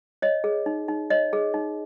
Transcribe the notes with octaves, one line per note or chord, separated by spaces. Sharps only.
C#5 D#5
G#4
D#4
D#4
C#5 D#5
G#4
D#4